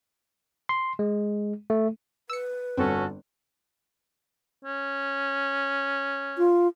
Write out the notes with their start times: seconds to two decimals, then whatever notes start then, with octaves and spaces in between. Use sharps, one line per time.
0.69 C6
0.99 G#3
1.70 A3
2.30 B4 E6 C#7
2.77 G1 C4 C#4 F#4 A4
4.65 C#4
6.38 F4